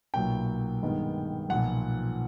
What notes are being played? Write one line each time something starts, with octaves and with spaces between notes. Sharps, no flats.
B1 A#2 F#3 A#3 G5
G2 D#3 G#3 B3
B1 A#2 F3 F#5